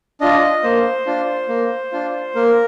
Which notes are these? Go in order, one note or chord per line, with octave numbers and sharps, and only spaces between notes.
D4 F4 D#5
A#3 C5
D4 F4
A#3
D4 F4
A#3 A#4